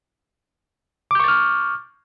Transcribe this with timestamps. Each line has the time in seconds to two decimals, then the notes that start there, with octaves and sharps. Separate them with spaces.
1.11 D6
1.15 G6
1.20 C#6
1.24 A6
1.28 F6